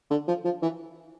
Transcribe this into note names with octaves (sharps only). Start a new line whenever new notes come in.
D3
F3
F3
E3